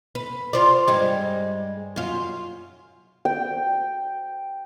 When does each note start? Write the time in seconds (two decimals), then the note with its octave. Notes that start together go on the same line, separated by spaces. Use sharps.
0.15 B4
0.53 F4 C5 D5
0.88 G2 G3 G#3
1.96 F#2 F4
3.25 G5